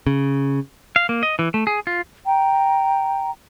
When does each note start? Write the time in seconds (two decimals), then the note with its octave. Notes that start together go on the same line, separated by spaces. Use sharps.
0.07 C#3
0.96 F5
1.09 A#3
1.23 D#5
1.39 E3
1.54 A3
1.67 G#4
1.87 F4
2.26 G5 A#5